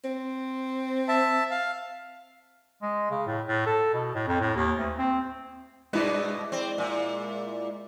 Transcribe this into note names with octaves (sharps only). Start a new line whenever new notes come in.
C4
E5 A5
F5
G#3
C#3
A2
A2
A4
B2
A2
F2
A2
D#2
D2
C4
G2 B2 G#3 E4 B4 D5
C4
A#2